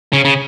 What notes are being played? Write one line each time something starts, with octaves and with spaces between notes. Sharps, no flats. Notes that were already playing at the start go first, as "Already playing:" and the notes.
C#3
C#3